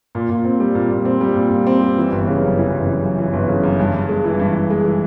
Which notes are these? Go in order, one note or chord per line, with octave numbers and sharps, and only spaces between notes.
A#2
A#2
C4
G3
A#2
A#2
C4
G3
A#2
A#2
C4
G3
E3
G1
C#3
F#2
E3
G1
C#3
F#2
E3
G1
C#3
F#2
G2
G2
G#3
E3
G2
G2
G#3
E3